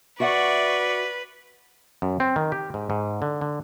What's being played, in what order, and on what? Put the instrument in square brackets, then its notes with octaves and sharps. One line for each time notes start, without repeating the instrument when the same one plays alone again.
[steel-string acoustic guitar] F#4 E5 F#5 [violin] B4 [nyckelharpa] D5 C#6
[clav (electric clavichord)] F#2
C4
D#3
G4
G#2
G#2
D3
D3